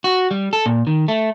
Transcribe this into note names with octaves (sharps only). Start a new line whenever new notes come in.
F#4
G3
A4
A#2
D#3
A3